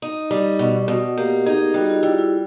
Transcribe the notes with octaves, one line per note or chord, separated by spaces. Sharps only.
D#4
G3
B2
B2
A#3 G4
D#4 G#4
G3 F#4
F4
G3 E4
E4